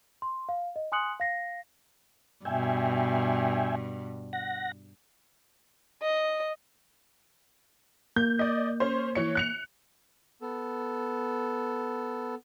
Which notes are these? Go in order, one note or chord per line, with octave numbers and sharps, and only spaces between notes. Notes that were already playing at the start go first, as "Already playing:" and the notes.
C6
F5
D#5
G#5 C6 D#6 F#6 C#7 F#7
F5 A#6 C7
G2 B2 E5 G5 G#5
F#5 A#6
D#5
A#3 G6
D5 D#5
C#4 C5
E3 C#5 C#7
F#6 C#7 F7
B3 A4